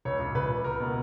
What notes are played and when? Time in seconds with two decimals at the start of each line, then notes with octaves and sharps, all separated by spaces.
0.05 C#2 C#5
0.20 C#2
0.35 C#2 B4
0.50 C#2
0.64 C#2 A#4
0.80 B2